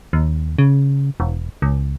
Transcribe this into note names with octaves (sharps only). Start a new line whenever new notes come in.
D#2
C#3
E1
C#2